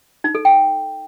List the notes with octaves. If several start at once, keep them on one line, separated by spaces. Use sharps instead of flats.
D#4
A4
G5